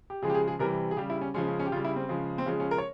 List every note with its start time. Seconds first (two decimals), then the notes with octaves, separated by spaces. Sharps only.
0.10 G4
0.22 C#3 F3 G#3 G#4
0.30 G4
0.34 G#4
0.48 G#4
0.59 C3 E3 G3 A#4
0.91 G#4
0.97 C#3 G3 G4
1.10 E4
1.21 C#4
1.34 C#3 F3 G#3 C#4
1.47 C#4
1.59 C#4
1.66 G4
1.72 C#3 F4
1.76 G3
1.85 E4
1.96 C4
2.09 C#3 F3 G#3
2.38 C4
2.46 C#3 F3 G#3 C#4
2.60 C#4
2.71 A#4
2.78 C#5